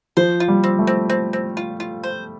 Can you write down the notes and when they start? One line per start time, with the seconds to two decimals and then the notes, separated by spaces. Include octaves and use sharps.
0.17 F3 C5
0.40 F4
0.48 G3
0.64 C4
0.79 A3
0.87 C4
1.10 C4
1.33 C4
1.57 F4
1.80 F4
2.03 C5